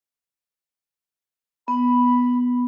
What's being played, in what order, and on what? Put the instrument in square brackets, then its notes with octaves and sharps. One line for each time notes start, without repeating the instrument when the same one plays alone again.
[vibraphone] B3 [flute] B5